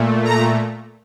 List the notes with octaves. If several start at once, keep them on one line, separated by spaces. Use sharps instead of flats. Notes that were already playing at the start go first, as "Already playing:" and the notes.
Already playing: A#2 A3
A#5